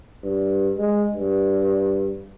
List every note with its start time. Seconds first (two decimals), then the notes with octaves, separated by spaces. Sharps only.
0.24 G2
0.78 G#3
1.15 G2